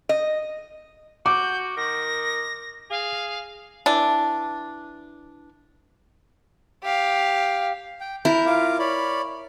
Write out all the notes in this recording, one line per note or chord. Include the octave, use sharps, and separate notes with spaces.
D#5
F#4 D6 G6
D#3 A#6
G#4 F5
E3 D4
G4 F5
G5
E4 A#4 G6
F4 F5 D6
C#5 D5 B5